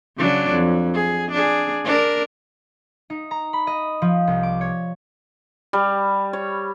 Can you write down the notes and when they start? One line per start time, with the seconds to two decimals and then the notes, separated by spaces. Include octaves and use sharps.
0.18 C#3 F#3 D4
0.50 F2
0.94 G#4
1.31 D4 G#4
1.85 D4 A#4
3.10 D#4
3.31 A#5
3.53 B5
3.67 D#5
4.02 F3
4.27 C2
4.43 D6
4.61 C#5
5.73 G3
6.33 C#5